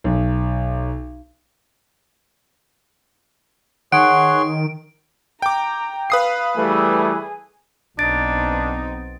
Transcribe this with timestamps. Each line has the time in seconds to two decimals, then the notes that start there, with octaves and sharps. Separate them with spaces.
0.04 B1
3.92 D#3 G#4 C#5 F#5 C6 D7
5.42 G5 A#5 D6
6.10 B4 F5 D#6 C7
6.56 E3 G3 A3 G#4
7.99 B1 B3 C4 D4 D#4 A6 D7